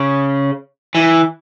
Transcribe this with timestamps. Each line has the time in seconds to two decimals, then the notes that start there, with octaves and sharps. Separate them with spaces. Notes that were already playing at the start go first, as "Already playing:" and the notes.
Already playing: C#3
0.95 E3